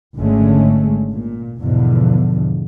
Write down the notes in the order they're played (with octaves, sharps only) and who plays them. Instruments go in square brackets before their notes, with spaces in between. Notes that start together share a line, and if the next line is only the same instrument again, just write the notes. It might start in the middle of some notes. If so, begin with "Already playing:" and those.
[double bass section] G#1 D3 G#3 A3 C#4
A#2
E2 G#2 B2 D3 F3